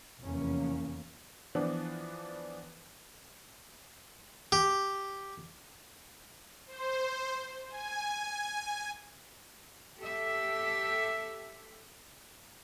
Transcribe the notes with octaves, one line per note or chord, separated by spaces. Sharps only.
F1 E2 A#3 C#4
E3 F3 B3 D4
G4
C5
G#5
G4 A4 E5